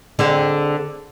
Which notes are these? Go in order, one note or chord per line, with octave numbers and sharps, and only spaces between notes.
D3 C4 G#4